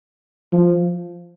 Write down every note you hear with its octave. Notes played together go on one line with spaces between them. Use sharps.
F3